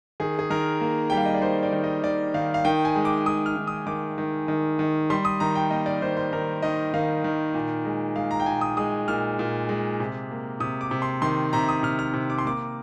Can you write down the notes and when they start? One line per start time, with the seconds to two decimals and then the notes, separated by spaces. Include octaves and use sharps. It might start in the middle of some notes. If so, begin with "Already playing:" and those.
0.20 D#3 G#4
0.39 G#4
0.50 D#3 A#4
0.81 A#3
1.10 G3 G5
1.17 F5
1.26 D#5
1.35 D5
1.42 D#3 C5
1.63 D5
1.73 D#3
1.84 D#5
2.03 D#3 D5
2.34 D#3 F5
2.54 F5
2.65 D#3 G5
2.85 G#5
2.96 G#3
3.05 D6
3.26 G#3 D#6
3.46 F6
3.56 D#3
3.67 D#6
3.87 D#3 D6
4.18 D#3
4.48 D#3
4.79 D#3
5.10 G3 C6
5.25 D#6
5.40 D#3 A#5
5.55 G5
5.71 A#3 D#5
5.86 D5
6.02 D#3 C5
6.17 C5
6.33 D#3 A#4
6.62 D#3 D#5
6.94 D#3 F5
7.24 D#3
7.54 A#2
7.85 G#3
8.15 G#3 F5
8.31 A#5
8.40 G5
8.46 A#2 G#5
8.61 D#6
8.77 G#3 D#6
9.08 A#2 F6
9.39 A#2
9.69 G#3
10.00 C3
10.31 A#3
10.60 C3 D#6
10.81 D6
10.91 C3
11.02 C6
11.22 D#3 C6
11.53 C3 A#5
11.69 D#6
11.83 C3 F6
11.99 F6
12.14 C3
12.30 D6
12.38 C6
12.45 A#3 D6